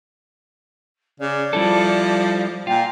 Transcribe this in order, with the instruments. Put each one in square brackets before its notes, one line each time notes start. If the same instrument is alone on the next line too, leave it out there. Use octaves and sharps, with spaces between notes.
[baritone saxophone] C#3 [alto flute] D5
[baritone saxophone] F3 [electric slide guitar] G3 E4 A4
[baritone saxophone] A#2 [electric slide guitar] F4 [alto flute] G5